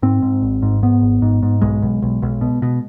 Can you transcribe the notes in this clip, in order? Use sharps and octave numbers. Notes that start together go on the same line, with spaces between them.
G#2 C4
G#2
G#1
G#2
G#2 B3
G#1
G#2
G#2
B1 G#3
B1
B1
B1
B2
B2